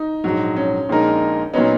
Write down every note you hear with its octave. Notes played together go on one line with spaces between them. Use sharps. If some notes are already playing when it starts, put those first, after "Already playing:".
Already playing: D#4
A#1 G#2 F#3
C#4
A#1 A#2 G#3 D#4 A#4
A#2 F#3 B3 C#4 D#4